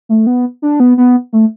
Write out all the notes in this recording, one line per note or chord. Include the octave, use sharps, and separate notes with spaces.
A3
B3
D4
B3
B3
A3